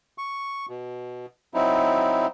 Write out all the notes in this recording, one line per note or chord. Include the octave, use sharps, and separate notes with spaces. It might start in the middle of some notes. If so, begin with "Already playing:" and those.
C#6
B2
F#3 C4 D#4 E4